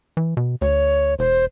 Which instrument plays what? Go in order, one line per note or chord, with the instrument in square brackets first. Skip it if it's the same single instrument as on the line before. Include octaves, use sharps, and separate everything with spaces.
[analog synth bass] E3
B2
[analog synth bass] D2 [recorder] C#5
[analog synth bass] E1 [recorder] C5